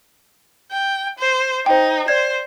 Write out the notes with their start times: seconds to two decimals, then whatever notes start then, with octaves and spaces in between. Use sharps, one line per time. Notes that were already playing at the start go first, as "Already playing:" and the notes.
0.72 G5
1.18 C5
1.66 D#4 C5 G5
2.08 C5 D5 G#6